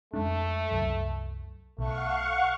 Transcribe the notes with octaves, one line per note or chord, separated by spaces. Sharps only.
F2 G#3 A3 D4
C2 F#2
B1 A3 F5 F#5 C#6